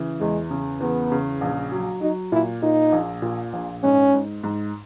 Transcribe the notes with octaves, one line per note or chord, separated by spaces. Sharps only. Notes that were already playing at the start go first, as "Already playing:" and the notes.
Already playing: C#3 E3
E2 G#3
C#3
E2 B3
C#3
A#1
F#3
F#3 D#4
A#2 E4
A#2 D#4
A#1
A#2
A#1
G#2 C#4
G#2
G#2